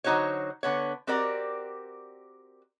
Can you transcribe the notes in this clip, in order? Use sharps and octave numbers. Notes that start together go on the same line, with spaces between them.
D3 F#3 D#4 F#4 C5 C#5
D3 B3 C#5
C4 F#4 G4 A#4 D5